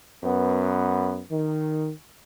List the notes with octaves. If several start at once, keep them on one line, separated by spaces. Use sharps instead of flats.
F#2 B3
D#3